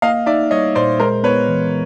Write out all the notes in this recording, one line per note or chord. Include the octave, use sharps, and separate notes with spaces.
A#3 D#5 F5
D#4 D5 E5
G3 C#5 D#5
A#2 C5 D5
G#3 A#4 C5
B3 B4 C#5
E3